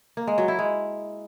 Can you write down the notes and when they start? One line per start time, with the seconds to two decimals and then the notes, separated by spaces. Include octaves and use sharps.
0.17 A#3
0.27 G#3
0.38 F#3
0.48 E4
0.59 G#3